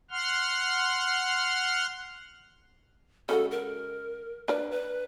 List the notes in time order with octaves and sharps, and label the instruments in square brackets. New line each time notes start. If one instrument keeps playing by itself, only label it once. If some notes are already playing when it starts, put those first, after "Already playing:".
[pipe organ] F#5 C6 F6
[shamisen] C#3 G#3 F#4 [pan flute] A4
[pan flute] A#4
[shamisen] D4 A#4 D5 [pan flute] B4
[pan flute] B4